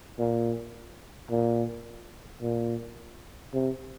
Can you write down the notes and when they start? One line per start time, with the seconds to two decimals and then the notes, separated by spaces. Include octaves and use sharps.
0.19 A#2
1.30 A#2
2.42 A#2
3.53 C3